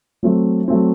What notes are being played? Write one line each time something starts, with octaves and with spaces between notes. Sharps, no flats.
F#3 A3 C4
F#3 A3 C4